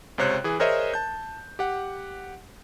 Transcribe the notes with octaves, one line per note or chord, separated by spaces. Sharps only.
C#2 C3 C5 C#5 F#6
E3 G#4
G#4 A#4 C5 C#5 D#5 E5
A5 G6
G4 F#5